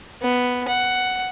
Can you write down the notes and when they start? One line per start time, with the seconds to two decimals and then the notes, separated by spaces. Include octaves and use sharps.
0.22 B3
0.68 F#5